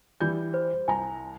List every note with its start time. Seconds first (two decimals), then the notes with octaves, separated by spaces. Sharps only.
0.20 E3 G3 G6
0.54 C5
0.88 C2 G#5 A#5